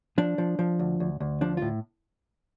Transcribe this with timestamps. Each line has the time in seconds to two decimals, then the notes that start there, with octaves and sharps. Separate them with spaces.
0.18 F3 D4
0.38 F3
0.59 F3
0.79 D2
1.00 D2
1.20 D2
1.41 F3 D4
1.57 A2 F4